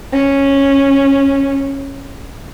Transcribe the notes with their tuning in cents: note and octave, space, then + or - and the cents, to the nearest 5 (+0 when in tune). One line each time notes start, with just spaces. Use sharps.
C#4 -10